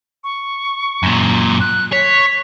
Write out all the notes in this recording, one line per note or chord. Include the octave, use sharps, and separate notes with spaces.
C#6
F#2 A#2
F#6
C#5 B6